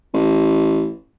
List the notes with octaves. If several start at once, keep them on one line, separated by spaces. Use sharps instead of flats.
A1